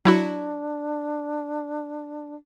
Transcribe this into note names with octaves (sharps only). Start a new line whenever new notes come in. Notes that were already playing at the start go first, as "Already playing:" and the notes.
F#3 D4 E4 F#4